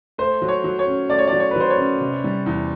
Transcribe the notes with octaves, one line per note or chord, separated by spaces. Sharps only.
A3 C5
F#3
C#5
F#3
C#5
C#4
A3 D5
C#5
D5
F#3
C#5
B4
F#3 C5
C#5
C#4
C3
G3
E2